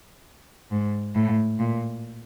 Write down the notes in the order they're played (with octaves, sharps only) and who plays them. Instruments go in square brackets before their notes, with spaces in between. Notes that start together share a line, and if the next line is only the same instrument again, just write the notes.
[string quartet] G#2
A2
A#2